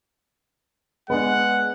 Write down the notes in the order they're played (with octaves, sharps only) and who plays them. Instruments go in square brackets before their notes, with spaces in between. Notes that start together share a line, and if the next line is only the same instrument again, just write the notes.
[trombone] G#3 [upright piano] B3 D4 [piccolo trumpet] F#5